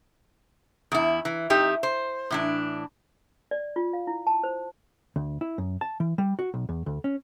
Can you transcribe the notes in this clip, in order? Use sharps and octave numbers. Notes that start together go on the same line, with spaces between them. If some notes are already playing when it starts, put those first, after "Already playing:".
E2 E4
E3
F2 D#4 G4 E5
C5
A2 E3 D4
D5
F4
F5
E4
A5
C5
D2
E4
F#2
A5
E3
G3
F#4
B1
E2
D2
C#4